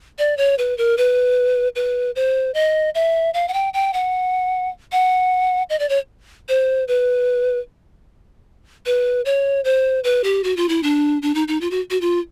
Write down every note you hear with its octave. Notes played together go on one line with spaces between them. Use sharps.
D5
C#5
B4
A#4
B4
B4
C5
D#5
E5
F5
F#5
G5
G5
F#5
F#5
D#5
D5
C#5
C5
B4
B4
C#5
C5
B4
G4
F#4
F4
E4
D4
D4
D#4
D#4
F4
F#4
F#4
F4